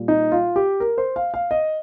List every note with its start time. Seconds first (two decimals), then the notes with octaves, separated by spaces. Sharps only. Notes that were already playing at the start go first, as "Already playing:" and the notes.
Already playing: A#2 G3
0.08 D#4
0.32 F4
0.56 G4
0.80 A#4
0.98 C5
1.16 F5
1.34 F5
1.51 D#5